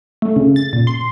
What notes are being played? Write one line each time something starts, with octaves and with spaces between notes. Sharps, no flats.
A3
C#3
A6
A#2
C6